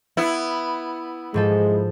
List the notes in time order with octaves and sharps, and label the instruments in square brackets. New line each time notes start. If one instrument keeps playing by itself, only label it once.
[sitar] B3 E4
[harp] G#2 F3 A4 [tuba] G#3